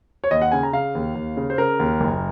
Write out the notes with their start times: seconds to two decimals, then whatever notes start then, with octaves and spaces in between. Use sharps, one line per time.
0.24 C#5
0.31 D#2 D#5
0.42 F#5
0.52 C#3 G#5
0.63 A#5
0.73 C#3 F5
0.95 D#2
1.15 D#2
1.37 C#3
1.50 C5
1.58 C#3 A#4
1.80 D#2
2.00 F#1